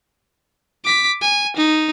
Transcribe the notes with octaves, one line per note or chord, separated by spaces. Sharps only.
D6 B6
G#5
D#4